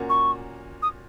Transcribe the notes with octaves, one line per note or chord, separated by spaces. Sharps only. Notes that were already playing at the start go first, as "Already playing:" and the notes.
Already playing: A#2 A#3 C#4 F#4
C#6
D#6